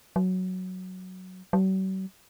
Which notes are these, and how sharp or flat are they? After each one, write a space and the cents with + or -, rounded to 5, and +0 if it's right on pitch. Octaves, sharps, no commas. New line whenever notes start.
F#3 +0
F#3 +45